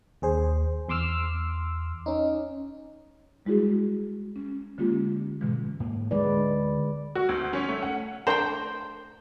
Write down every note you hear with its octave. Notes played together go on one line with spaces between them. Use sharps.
D#2 G#4 C5
E2 C6 D6 E6 F6
C#4 D#4
G3 G#3 E4 F#4 G#4
C#4
D3 G#3 A#3 C#4 F4 G4
G#2 B2 D3 E3 G#3
G#2 A#3
D2 D3 G#3 B4 D5
F#4
D2
C#4
A3
F#5
A3 D4 A#4 C5 G5